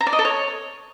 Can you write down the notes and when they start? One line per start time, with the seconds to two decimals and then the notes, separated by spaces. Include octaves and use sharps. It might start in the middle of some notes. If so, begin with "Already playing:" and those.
0.01 A#5
0.07 D5
0.13 D#5
0.19 A4
0.25 C#5